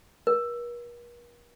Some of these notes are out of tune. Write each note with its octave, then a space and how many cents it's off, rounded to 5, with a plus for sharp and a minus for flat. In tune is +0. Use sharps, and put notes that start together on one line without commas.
A#4 +45